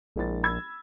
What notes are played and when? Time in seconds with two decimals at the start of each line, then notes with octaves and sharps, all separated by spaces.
0.16 A#1 G#3 E4 A6
0.43 B5 E6 G#6